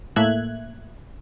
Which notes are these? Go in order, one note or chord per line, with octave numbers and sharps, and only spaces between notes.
A2 A3 A#3 E5 F#6 G#6